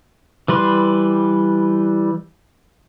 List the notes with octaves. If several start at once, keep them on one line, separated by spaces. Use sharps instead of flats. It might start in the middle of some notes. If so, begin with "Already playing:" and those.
E3 G3 B4 C6